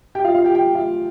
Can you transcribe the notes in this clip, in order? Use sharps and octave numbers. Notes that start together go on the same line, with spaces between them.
G4 G5
F4 F5
F4 F5
G4 G5
G4 G5
F4 F5